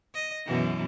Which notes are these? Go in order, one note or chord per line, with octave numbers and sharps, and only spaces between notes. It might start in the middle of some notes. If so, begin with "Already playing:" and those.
D#5
F#2 B2 E3